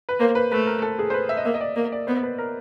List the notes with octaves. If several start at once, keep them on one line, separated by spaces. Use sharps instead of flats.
B4
A#3 C5
B4
A3 B4
A#4
A4
G#4
C5
B4
E5
D#5
A#3 E5
D#5
D5
A#3
D5
B3 C5
B4
A#4